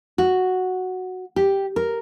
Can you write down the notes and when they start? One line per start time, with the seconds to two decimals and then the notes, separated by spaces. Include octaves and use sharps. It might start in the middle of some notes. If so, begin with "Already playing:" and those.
0.18 F#4
1.36 G4
1.76 A#4